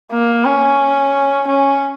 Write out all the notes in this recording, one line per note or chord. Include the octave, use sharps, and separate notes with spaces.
A#3
C#4
C#4